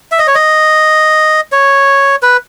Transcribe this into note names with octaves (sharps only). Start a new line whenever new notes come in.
E5
D#5
C#5
D#5
C#5
B4